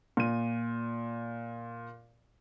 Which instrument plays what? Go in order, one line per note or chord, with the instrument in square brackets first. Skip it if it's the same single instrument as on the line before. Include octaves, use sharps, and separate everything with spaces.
[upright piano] A#2 D#7